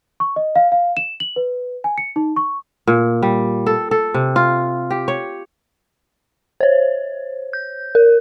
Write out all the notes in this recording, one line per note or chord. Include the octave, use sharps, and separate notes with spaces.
C#6
D#5
F5
F5
E7
F#7
B4
G#5
C#7
D#4
C#6
A#2
G3
A4
A4
C3
F4
G4
C#5
C5 C#5
G6
A#4